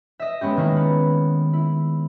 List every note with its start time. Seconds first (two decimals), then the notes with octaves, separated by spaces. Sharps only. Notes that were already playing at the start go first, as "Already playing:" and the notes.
0.19 D#5 E5
0.41 G#3 B3 C#4 G4
0.57 D#3 G#3 A#3 E4
0.76 B3
1.53 E4